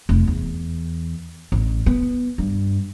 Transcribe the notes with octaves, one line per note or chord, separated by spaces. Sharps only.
F1
E2
A1
B3
G2